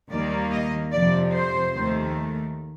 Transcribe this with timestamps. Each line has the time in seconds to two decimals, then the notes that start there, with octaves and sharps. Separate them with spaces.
0.10 D#2 D#3 G3 A#3 D5
0.52 D#5
0.92 F2 C3 F3 D5
1.34 C5
1.75 D#2 D#3 A3